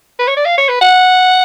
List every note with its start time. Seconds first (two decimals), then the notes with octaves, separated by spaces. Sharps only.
0.19 B4
0.28 C#5
0.37 D5
0.45 F5
0.58 C#5
0.69 B4
0.81 F#5